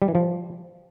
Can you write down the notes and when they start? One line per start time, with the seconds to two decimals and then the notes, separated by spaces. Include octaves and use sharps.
0.02 G3
0.08 E3
0.15 F3